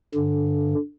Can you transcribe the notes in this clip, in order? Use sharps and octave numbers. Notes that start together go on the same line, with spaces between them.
G2 D3